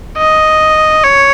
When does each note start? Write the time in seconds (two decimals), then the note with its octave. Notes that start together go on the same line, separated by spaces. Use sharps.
0.18 D#5
1.04 C#5